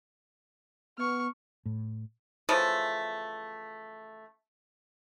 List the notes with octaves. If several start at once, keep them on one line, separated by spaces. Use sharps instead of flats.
B3 C#6 F6
A2
C#3 E3 F3 A3